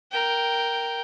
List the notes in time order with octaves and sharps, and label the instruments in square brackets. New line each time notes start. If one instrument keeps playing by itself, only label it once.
[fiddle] A#4 G5